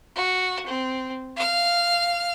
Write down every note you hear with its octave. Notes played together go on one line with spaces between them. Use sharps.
F#4
C4
F5 F6